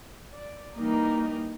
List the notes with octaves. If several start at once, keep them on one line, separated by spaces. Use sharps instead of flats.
D5
E3 G3 A#3 D#4 A#4 D#5